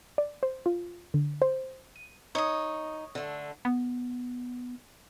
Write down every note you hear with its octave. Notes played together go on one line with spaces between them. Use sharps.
D5
C5
F4
D3
C5
D#7
D#4 C#5 D#5
D3 A3
B3